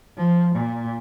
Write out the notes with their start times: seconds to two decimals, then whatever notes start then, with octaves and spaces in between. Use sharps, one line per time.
0.17 F3
0.55 A#2